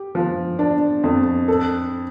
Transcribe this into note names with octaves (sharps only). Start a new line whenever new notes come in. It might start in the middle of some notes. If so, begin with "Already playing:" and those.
Already playing: G4
F3
D4
F2
A4